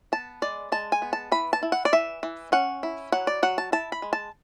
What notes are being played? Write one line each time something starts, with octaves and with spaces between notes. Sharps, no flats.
B3 A5
G#3 D5
G#3 A5
G#5
B3
A5
E3 B5
A5
E4
F#5
D5
E3 E5
E3
C#4 F#5
E4
F#3 F#5
D5
F#3 F#5
A5
E4 A5
B5
G#3
A5